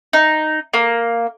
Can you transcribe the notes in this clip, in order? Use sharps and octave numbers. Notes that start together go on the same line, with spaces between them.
D#4
A#3